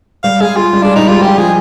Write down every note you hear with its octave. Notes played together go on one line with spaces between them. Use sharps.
G3 F5
G#3 G#4
G#3 F4
G3
G#3 D4
G3 D#4
G#3 F4
G3 G4
F3 G#4